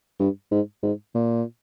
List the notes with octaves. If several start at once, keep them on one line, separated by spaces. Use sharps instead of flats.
G2
G#2
G#2
A#2